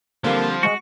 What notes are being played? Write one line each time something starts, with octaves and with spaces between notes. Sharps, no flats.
D3 F3 G3 A#3 C4
G#3 F#4 C#6